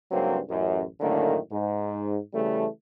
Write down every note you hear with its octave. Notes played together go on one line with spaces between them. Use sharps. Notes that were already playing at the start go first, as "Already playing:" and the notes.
C#2 G2 F#3 A#3 C4
A1 F#2
F#2 A2 D3 D#3 A3 A#3
G#2
C#3 E3 G3 A3